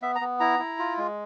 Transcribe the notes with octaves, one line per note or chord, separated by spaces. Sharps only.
B3 E5
A#5
B3
E4 A#5
E4
F4
G#3